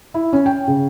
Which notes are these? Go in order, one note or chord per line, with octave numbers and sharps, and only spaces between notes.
E4
C#4
G5
C#3